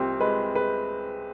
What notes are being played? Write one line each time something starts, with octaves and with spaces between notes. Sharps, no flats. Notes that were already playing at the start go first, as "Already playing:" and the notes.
Already playing: C2 C4 G4
G#3 B4
G#3 B4